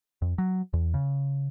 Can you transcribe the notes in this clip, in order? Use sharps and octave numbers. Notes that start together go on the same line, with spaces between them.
F2
F#3
E2
C#3